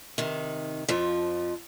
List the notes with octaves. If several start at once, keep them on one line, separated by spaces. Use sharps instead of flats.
C3 D#3
F2 F3